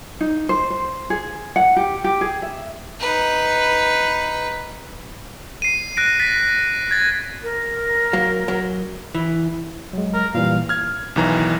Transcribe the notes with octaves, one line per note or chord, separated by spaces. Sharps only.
D#4
C5
C5
G#4
F#5
G4
G4
G#4
E5
D#4 B4
C7 D#7
F#6 A#6 D7
A6 B6
G#6 A6
A#4
F#3 A#3
F#3
E3
F#3 G#3
A#4
A#2 E3 G3 F5
F6 G#6
B1 D#3 E3 A#5